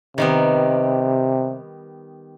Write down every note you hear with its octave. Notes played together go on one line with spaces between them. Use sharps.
C3 D#3 G3 B3